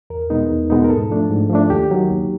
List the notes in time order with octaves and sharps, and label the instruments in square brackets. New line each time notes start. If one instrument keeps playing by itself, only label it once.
[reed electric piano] E2 A#4
B2 G#3 B3 D#4
E2
B2 G#3 B3 D#4
A#4
G#2 A4
F3 A3 D4
G#2
F3 A3 D4
D#2 G4
D#3 F#3
D#2